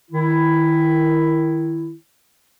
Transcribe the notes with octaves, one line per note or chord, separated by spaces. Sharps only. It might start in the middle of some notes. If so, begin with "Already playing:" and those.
D#3 E4